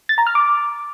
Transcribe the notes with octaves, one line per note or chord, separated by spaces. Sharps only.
A6
A#5
F6
D6